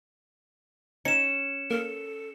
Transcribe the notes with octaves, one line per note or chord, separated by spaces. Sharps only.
C#4 D#4 C#7 E7
A#3 A4